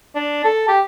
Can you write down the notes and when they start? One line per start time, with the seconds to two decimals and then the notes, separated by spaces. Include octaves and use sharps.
0.15 D4
0.45 A4
0.68 G4